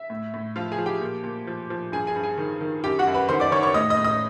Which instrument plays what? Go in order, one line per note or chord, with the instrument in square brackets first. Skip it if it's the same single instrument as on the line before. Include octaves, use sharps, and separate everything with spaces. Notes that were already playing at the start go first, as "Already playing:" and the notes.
Already playing: [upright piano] E5
A2
A2
F3 F4 F5
G#4 G#5
F3
G4 G5
A#2
A#2
F3
F3
G2 G#4 G#5
G#4 G#5
G2
G#4 G#5
D#3
D#3
F#2 G4 G5
F#4 F#5
F#2
B4 B5
D#3 C5 C6
D5 D6
D#3 C#5 C#6
C#5 C#6
A2 D#5 D#6
D#5 D#6
A2
D#5 D#6